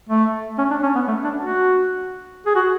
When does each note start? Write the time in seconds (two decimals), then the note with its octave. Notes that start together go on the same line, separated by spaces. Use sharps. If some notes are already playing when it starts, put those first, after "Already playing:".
0.09 A3
0.58 C#4
0.71 D4
0.83 C#4
0.95 B3
1.08 A3
1.24 D4
1.40 F#4
2.46 G#4
2.55 F#4